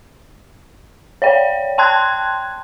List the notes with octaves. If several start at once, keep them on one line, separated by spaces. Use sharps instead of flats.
C#5 D5 G5
G5 A5 C6 F#6 G#6